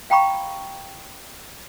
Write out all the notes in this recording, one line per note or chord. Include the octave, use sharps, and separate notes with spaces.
F5 G5 A#5 B5 C#6